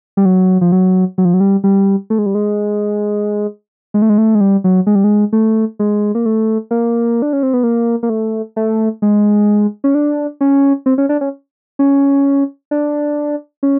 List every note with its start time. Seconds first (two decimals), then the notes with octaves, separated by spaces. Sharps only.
0.17 G3
0.25 F#3
0.61 F3
0.72 F#3
1.18 F#3
1.25 F3
1.34 F#3
1.40 G3
1.64 G3
2.10 A3
2.19 G#3
2.26 G3
2.35 G#3
3.94 G#3
4.02 A3
4.09 G#3
4.18 A3
4.35 G#3
4.41 G3
4.64 F#3
4.87 G#3
4.95 G3
5.04 G#3
5.33 A3
5.79 G#3
6.15 A#3
6.26 A3
6.71 A#3
7.22 D4
7.33 C#4
7.43 C4
7.53 B3
7.63 A#3
8.03 A#3
8.10 A3
8.56 A3
9.02 G#3
9.84 C#4
9.95 D4
10.41 C#4
10.86 C4
10.98 C#4
11.09 D4
11.21 C#4
11.79 C#4
12.71 D4
13.63 C#4